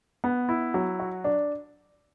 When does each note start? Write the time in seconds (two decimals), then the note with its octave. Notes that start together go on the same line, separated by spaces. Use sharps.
0.24 B3
0.49 E4
0.74 F#3
0.99 F#4
1.24 D4